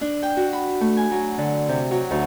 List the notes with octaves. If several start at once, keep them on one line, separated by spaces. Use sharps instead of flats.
D4
G5
F#4
B5
A3
G#5
F#3
D3
C3
F#3
D2